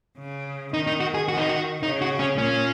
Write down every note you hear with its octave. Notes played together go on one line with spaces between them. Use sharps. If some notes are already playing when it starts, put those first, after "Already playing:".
C#3
D#3 D#4
D#4
F#4
G#4
D#3 F#4
D#4
F#4
C#3 D#4
F#4
C#4
A#2 C#4